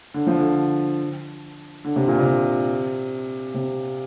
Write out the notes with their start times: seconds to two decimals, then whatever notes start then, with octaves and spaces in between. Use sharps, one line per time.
0.14 D3
0.27 F3
0.39 D3
1.85 D3
1.96 C3
2.07 A#2
2.19 C3
3.54 C3